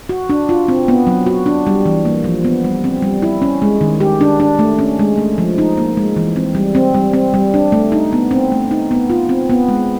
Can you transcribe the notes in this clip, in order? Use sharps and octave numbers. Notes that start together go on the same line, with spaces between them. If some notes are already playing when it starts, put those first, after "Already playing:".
F#4
D4
F4
C4
B3
F#3
F#4
D4
G3
E3
A#3
F3
B3
G3
C4
G3
E4
C#4
G#3
D#3
G4
D4
D4
A3
C#4
G#3
A3
F3
D#4
A#3
G#3
E3
C4
G3
C4
G3
C4
G3
D4
A3
D#4
B3
C4
A3
D#4
B3
F4
C4
B3
G#3